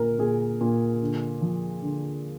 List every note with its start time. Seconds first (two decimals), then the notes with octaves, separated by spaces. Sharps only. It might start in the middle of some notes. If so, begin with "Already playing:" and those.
Already playing: A#2 A#4
0.19 A#2 G#4
0.61 A#2
1.02 D3
1.41 F3
1.82 D3